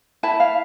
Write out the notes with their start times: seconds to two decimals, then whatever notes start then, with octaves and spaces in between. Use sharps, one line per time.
0.23 E4 A5
0.40 F5